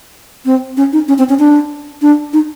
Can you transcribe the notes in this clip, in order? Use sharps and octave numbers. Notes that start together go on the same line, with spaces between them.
C4
C#4
D#4
C#4
C4
C#4
D4
D4
D#4